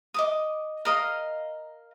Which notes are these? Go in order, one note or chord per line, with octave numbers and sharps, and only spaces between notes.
D#5 D6 D#6
A#4 D#5 F5